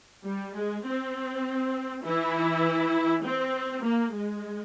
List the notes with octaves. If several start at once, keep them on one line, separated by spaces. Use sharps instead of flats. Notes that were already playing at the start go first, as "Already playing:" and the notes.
G3
G#3
C4
E3 E4
C4
A#3
G#3